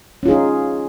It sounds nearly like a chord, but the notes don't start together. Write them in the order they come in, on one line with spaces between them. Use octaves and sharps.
C#4 F4 G#4 D#4